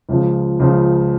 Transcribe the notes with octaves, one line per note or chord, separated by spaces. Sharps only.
C#2 C#3 F3
C#2 C#3 F3